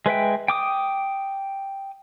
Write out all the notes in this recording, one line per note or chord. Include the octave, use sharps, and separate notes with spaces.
G#3 B4 E5 G5
G5 D6 D#6